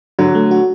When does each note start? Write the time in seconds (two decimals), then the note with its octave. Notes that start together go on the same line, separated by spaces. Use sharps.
0.19 D3 F#3 F#4
0.35 A3
0.51 F#4